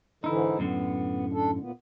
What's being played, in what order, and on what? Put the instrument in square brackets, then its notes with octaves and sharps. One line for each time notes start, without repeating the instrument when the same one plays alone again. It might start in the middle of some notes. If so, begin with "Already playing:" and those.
[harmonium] G#2 D3 E3 [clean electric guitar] D#4 E4
[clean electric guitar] F#2 A2 D3 [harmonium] B3
[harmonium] D4 A4
A#2 B3